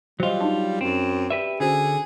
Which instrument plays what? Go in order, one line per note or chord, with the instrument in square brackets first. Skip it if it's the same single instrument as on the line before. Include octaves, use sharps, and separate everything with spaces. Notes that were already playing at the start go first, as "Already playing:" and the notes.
[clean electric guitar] F#3 F4 [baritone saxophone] G3 [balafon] C5 D#5
[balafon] D4 D#4 A5
[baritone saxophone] F#2 [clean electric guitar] C4
[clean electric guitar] G4 B4 E5 [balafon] D5
[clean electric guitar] D3 [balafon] C#4 F#4 C5 [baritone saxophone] G#4